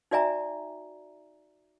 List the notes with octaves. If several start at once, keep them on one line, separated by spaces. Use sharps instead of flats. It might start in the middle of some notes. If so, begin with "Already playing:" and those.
D#4 F#4 D5 E5 G#5 A#5